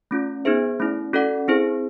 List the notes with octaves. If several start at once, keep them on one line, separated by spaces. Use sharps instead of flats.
A3 C#4 F4
B3 D#4 G#4 C5 E5
A3 C#4 E4
C#4 F#4 A4 D5 F#5
C4 E4 G#4 C5